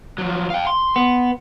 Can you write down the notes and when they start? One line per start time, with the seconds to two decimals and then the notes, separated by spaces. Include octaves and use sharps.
0.18 F3 F#3
0.50 F5 G5
0.67 C6
0.96 B3